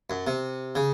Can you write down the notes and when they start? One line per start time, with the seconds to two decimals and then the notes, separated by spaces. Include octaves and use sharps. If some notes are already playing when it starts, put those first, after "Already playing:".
0.10 F#2
0.27 C3
0.75 C#3